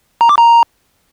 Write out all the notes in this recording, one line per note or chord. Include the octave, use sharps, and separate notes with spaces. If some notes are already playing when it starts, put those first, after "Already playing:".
A#5
D6
A#5